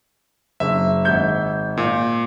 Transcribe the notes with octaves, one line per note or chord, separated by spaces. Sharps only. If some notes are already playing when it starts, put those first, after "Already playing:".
F#1 E5
G#1 G6
A#2